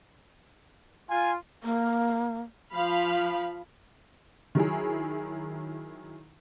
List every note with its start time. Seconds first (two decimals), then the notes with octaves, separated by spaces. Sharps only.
1.09 F4 G#5
1.64 A#3
2.73 F3 F5 B5
4.55 D#3 F#3 E4 G#4